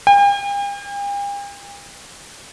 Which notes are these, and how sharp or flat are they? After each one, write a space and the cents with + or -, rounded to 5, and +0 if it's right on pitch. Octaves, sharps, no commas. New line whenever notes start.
G5 +45